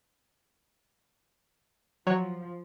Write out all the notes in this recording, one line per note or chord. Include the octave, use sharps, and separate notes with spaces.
F3 F#3 C#5